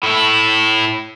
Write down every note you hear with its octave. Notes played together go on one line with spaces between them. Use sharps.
A2 E4